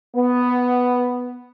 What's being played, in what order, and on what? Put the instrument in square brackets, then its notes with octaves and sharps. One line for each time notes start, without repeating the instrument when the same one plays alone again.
[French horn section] B3